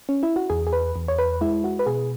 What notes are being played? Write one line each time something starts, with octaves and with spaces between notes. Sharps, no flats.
C#4
E4
F#4
E2 G#4
G#4
B4
E2
C#5
B4
G#3 E4
F#4
B4
B2 G#4